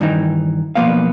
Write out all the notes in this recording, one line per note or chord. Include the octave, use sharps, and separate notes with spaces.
G2 D#3 E3 D#4
B1 E2 F3 A#3 B3 F5